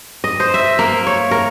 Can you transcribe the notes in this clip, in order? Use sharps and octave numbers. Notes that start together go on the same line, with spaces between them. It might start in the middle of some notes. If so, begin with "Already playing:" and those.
D#5
C5
E5
A#3
C#5
A#4